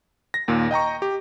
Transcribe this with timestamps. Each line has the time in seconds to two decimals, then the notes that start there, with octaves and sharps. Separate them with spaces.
0.34 A#6
0.48 D#2 A#2
0.71 D#5 G5 A#5 C#6
1.02 G4